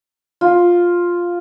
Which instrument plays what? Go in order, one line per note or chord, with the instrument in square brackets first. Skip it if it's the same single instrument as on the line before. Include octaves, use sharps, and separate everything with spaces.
[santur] F4